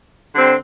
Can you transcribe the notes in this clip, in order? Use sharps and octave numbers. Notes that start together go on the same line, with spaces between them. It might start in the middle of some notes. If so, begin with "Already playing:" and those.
D3 G3 C4